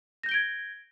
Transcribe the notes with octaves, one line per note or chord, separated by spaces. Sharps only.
G6 G#6 A#6 D7 G7